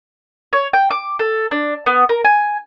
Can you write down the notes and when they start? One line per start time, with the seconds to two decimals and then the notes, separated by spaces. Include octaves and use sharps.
0.53 C#5
0.73 G5
0.91 D6
1.19 A4
1.51 D4
1.86 B3
2.09 A#4
2.25 G#5